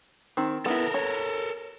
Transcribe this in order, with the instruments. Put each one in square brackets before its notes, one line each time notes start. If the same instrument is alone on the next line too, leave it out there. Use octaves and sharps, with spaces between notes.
[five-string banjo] D#3 C4
[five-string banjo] B3 E4 [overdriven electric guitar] A4 A#4
[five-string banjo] C#5